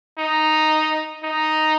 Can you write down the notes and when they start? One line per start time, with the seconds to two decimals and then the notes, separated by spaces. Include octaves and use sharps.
0.18 D#4
1.24 D#4